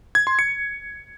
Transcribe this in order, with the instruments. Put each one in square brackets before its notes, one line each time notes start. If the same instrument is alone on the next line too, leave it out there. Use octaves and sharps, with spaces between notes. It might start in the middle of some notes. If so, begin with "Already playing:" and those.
[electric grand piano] G#6
C6
C#7